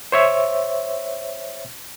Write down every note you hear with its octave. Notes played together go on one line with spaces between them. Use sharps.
C5 C#5 E5